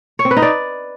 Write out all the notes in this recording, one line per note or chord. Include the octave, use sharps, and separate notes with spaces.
C#5
C4
B4
D#4
D5